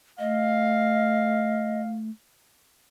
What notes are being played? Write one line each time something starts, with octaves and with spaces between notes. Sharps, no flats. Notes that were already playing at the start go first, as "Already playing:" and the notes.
A3 D#5 F5